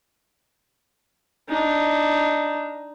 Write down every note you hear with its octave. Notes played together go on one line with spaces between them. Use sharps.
D4 D#4